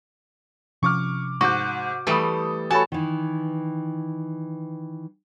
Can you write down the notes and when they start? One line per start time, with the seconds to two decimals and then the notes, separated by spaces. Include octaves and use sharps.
0.83 C3 F3 C#4 C#6 D6 F6
1.41 G#2 F#4 C#6 D6 G6
2.07 E3 G3 A3 A4 D#6
2.71 F#4 A4 C#5 G#5 A5 B5
2.92 D#3 E3